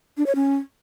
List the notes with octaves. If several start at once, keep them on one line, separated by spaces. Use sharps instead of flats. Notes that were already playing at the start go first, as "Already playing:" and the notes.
D4
C#5
C#4